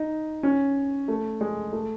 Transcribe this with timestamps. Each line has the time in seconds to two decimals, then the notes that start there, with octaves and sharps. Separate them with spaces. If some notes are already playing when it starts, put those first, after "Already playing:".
Already playing: D#4
0.43 C#4
1.08 A3
1.41 G#3
1.73 A3